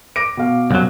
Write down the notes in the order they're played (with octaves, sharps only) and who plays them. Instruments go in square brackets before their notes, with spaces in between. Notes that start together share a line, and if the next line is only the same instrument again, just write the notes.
[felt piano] D6 A#6 D7
B2 F5
[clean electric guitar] C2 F#2 F#3